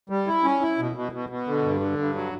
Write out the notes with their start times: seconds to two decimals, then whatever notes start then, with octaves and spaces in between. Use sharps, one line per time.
0.10 G3
0.27 E4
0.44 C#4
0.61 E4
0.78 B2
0.95 B2
1.12 B2
1.29 B2
1.47 D3
1.63 G2
1.80 D3
1.98 G2
2.15 F#3